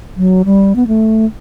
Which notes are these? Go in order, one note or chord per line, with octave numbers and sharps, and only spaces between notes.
F#3
G3
B3
A3